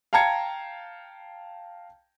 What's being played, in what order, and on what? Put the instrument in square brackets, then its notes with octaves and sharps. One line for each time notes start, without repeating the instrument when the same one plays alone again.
[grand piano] F5 G5 A5 A#5 G#6 C#7